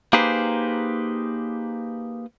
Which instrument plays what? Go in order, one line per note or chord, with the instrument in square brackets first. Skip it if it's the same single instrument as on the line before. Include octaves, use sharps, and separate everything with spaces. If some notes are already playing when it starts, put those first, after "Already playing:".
[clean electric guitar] A#3 D#4 G4 G#4 B4 C5